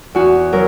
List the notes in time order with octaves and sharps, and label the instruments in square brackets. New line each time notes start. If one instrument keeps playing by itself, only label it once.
[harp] E2 F#4
F#3 A#4